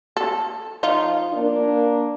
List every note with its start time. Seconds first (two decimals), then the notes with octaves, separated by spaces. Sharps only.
0.17 A4
0.83 F3 D#4 F4
1.34 A#3 D4 A#4